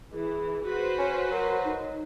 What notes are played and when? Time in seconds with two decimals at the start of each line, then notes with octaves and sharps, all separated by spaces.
0.12 E3 G#4
0.65 F#4 B4 C5
0.99 C#4 C#5
1.31 F#3 A#4
1.64 D#4